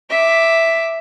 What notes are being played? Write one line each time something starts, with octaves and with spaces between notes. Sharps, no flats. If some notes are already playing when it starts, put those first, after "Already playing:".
E5 D6